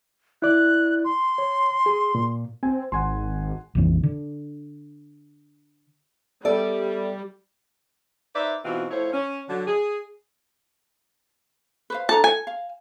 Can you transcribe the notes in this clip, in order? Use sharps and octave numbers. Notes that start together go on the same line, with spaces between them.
E4 D5 F#6
C6
C#5
G#4
A#2
C4 G#5
G#1 F#5 G#5 C6
A#1 F2 E3
D3
G3 B3 A4 D5 E5
D#4 B4 C5 D5 E5
B2 E3 C4 D#4 F4 F#4
A2 F3 E4 C5 C#5
C#4
D3 F#3
G#4
B4 C5 F5
D4 A4 A5 A#5
A4 G#5
F5